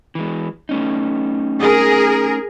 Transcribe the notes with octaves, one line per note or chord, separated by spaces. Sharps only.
E3 G#3
A3 C#4 D#4
G#4 A#4